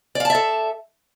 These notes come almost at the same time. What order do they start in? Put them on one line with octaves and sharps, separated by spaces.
D5 F5 A5 E5 A4